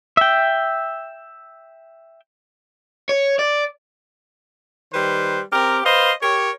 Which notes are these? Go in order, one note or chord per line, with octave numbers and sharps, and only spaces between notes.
E5 G5
C#5
D5
D#3 G3 B4 C5
C4 G4 A#4
B4 C5 D#5 F5
G4 A#4 C#5